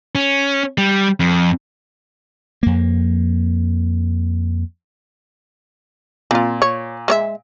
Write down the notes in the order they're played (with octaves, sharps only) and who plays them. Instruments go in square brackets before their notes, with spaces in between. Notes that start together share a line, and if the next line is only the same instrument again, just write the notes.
[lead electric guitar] C#4
G3
F2
[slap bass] F2 A#3
[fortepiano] A#2 [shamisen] C4 F4
[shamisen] C#5
G#3 C#5 E5